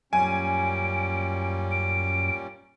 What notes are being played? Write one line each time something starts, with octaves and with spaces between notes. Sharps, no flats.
F#2 A#2 G3 C#4 G#5 D7
D7